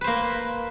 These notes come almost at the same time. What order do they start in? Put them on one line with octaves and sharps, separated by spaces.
B4 C5 A#3